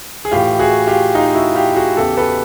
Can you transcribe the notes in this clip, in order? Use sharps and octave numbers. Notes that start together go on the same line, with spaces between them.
G#4
A2 E3 F4 G4
F#4 G#4
F4 G4
D#4 F4
E4 F#4
F4 G4
F#4 G#4
E2 C#3 E3 G4 A4
A4 B4